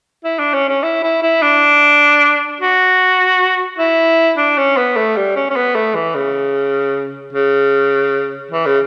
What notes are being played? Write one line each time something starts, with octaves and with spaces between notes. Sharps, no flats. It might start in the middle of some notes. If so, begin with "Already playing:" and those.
E4
D4
C#4
C#4
E4
E4
E4
D4
F#4
E4
D4
C#4
B3
A3
G3
C#4
C#4
B3
A3
E3
C#3
C#3
E3
C#3